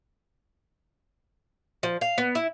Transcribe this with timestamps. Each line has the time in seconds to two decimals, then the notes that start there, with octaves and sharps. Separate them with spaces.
1.83 F3
2.01 F5
2.18 B3
2.35 E4